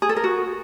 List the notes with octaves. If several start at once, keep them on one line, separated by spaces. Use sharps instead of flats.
G#4
A4
A#4
F#4